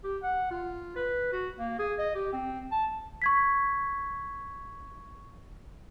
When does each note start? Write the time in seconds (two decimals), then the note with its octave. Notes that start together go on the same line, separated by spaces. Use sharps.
0.04 G4
0.23 F#5
0.51 F4
0.96 B4
1.32 F#4
1.58 A#3
1.79 G#4
1.98 D#5
2.15 G4
2.32 C4
2.71 A5
3.22 C#6 G#6 B6